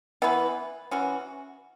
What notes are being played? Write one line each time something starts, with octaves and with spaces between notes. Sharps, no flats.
E3 B3 E4 B4
E3 C#4 F#4